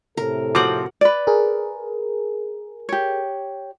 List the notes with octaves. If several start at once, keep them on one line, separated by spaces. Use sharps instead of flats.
A2 C3 A4 A#4
F3 C4 F#4 A#4 F#5 D6
B4 D5
G#4 A#4
G4 C#5